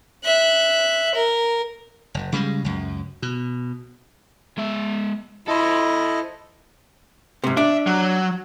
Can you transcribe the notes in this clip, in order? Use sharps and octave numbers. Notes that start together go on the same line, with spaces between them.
E5 F#6
A#4
F#1
C#3 G3 G#3
C#2 F#2
B2
G#3 E5
E4 A4 C5 D#5
G#2 C3
D4 E5
F#3